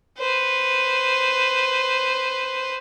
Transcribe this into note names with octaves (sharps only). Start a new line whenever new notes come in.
B4 C5